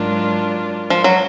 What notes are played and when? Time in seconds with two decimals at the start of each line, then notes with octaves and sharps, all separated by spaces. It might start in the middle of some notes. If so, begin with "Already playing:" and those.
Already playing: G#2 F#3 D4 F4 A#4
0.90 F3
1.04 F#3